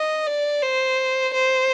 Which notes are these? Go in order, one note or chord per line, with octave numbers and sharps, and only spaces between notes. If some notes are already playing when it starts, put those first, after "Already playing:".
Already playing: D#5
D5
C5
C5